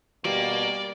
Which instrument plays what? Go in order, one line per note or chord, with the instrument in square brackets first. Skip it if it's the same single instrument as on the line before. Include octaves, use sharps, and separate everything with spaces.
[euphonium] B2 [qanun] G3 [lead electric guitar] A#3 [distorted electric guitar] D5